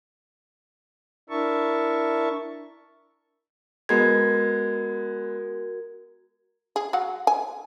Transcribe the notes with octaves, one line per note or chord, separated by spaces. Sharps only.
D4 E4 A#4 E5 A5 C#6
G#3 B3 F#4 A#4 G#6
G#4
F#3 F5 F#5
G#5